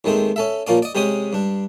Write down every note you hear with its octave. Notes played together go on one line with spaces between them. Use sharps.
D#2 D#3 G#3 A3 C4
C#4 A4 E5
A#2 F3 A#3 C#4 D5
D5 D#5
C3 G#3 C#4 G4 G#4 D#6
G2 D4